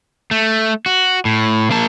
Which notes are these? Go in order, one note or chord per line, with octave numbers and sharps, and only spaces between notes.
A3
F#4
A2
A#3 A5